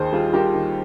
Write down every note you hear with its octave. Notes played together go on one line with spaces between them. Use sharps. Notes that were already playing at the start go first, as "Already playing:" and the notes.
Already playing: D#2 D#3 G#4 C5
G3 F4 G#4
G3 G4 A#4
D#3